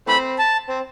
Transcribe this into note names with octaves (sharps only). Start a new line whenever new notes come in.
E3 A3 C4 B5
A5
C4